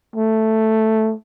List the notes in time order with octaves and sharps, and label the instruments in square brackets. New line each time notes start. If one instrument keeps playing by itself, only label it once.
[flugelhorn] A3